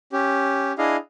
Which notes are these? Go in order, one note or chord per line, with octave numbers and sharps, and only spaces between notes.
C#4 G4
D4 E4 G#4 D#5 F5